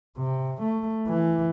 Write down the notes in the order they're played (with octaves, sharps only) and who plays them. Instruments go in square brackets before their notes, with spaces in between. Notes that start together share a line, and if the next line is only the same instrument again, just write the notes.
[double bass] C3
A3
E3